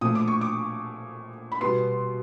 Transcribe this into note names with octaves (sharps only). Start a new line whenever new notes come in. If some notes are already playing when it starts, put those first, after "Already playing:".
A#2 F3 A3 D#6
D6
C#6
D6
B5
B2 G3 B3 C6